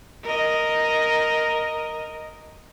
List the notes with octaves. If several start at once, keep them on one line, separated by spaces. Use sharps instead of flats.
A#4 D#5